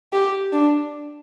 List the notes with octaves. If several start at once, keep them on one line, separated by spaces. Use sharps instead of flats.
G4
D4